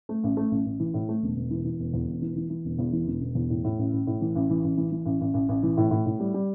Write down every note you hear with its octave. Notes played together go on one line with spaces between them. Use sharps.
A3
A1
A3
A1
A1
E3
A2
A3
E1
E1
E3
E3
E1
E2
E1
E3
E3
E3
E1
E2
E3
E1
E1
E2
A2
A2
A1
A1
A2
E3
A1
E3
A1
E3
E3
A1
A1
A1
A1
E3
A2
A2
A2
G3
G3